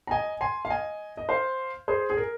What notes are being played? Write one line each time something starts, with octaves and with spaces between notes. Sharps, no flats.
A#5
D#5 G#5
G#5 C6
F5
D#5 G#5
D#5
C5 F5
G#4 C5
G#4
A#4